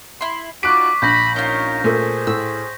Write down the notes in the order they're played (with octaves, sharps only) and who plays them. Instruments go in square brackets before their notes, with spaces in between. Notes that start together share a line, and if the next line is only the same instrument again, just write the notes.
[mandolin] E4 C6
[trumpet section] D#4 F4 F#4 [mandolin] D5 [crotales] C#6 B6 [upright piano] F#6 D7
[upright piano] A#1 [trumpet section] B5 [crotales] G6 A#6
[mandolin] C#4 F4 [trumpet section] D#4 A#4 C#5
[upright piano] A#2 A3 [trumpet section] G#4 C5
[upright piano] A2 [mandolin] E6